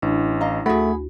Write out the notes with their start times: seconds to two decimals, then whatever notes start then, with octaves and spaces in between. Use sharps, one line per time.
0.02 A1 D4 E4
0.41 D#5 F5 A#5
0.66 D2 A3 F#4 G#4 F#5 B5 A#6